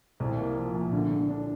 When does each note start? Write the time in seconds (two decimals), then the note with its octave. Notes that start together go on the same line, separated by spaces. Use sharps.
0.20 C2
0.38 A#3
0.56 F3
0.74 A#2
0.93 D3
1.11 D3
1.29 D4